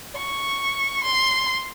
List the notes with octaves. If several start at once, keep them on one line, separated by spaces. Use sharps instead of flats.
C#6
C6